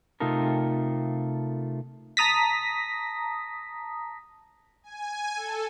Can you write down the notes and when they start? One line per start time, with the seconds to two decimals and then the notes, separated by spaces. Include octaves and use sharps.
0.20 C3 A3 D#4 F4 A4 A#4
2.17 A5 A#5 D#6 A#6 B6
4.83 G#5
5.36 A4